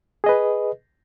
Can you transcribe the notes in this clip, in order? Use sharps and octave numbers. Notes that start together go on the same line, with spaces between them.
G#4 B4 D#5